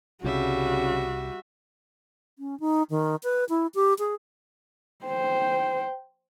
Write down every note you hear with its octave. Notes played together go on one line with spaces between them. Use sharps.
C2 C#3 G3 F#4 E5
C#4
D#4
D#3
B4
E4
G4
G#4
C5 G5